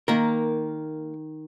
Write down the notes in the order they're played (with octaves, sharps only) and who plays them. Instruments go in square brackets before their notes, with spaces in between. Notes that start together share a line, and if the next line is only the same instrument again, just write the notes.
[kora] D#3 [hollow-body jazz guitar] A#3 A#4